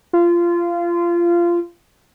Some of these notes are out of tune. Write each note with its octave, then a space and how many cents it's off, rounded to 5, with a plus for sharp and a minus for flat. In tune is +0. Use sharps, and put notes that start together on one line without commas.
F4 -20